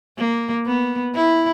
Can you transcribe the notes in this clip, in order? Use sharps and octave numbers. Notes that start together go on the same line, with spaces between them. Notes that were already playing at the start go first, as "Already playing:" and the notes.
A#3
B3
E4